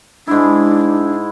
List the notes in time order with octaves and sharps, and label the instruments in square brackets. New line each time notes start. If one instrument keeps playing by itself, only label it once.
[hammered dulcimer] G#2 E4 [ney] D4